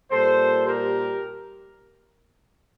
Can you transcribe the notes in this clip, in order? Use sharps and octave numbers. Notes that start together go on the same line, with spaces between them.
A#2 G3 A4 C5
G4 A#4